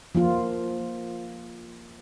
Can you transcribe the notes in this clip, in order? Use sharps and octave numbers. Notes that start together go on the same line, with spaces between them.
F3 A#3 F4